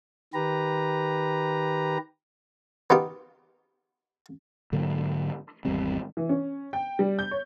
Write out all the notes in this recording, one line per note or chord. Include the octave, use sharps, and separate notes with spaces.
D#3 G4 B4 A#5
B3 D#4 F4 G4
G#2 D3 F#3 A#3
G#1 E2 G3 C4
E3
C#4
G5
G3
G6
C#5